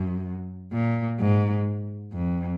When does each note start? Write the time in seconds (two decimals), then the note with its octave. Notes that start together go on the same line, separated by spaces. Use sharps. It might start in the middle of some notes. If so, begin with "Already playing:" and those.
Already playing: F#2
0.72 A#2
1.20 G#2
2.13 F2